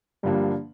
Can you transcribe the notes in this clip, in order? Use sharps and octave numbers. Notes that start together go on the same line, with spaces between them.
G2 D3 F3 G3 A#3 D4